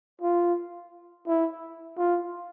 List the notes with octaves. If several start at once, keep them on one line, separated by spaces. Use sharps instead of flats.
F4
E4
F4